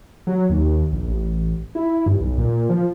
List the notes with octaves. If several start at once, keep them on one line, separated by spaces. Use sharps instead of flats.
F#3
D#2
A#1
A1
E4
G2
B1
A#2
F3